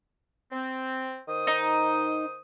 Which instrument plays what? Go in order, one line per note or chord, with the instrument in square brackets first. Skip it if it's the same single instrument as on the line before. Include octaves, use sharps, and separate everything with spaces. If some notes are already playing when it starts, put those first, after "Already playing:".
[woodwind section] C4
D#3 C5 D#6
[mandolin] D#4